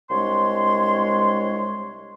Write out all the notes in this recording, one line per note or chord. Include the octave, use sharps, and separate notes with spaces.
C2 G#3 D4 C#5 C6